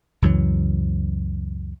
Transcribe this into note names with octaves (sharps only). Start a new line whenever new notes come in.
C#2 F#2 E3 F#3